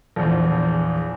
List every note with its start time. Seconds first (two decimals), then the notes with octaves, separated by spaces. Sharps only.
0.16 A#1 E2